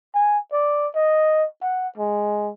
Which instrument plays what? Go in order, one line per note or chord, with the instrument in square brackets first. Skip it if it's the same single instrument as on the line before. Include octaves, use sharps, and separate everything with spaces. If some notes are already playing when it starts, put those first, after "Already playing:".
[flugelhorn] G#5
D5
D#5
F#5
G#3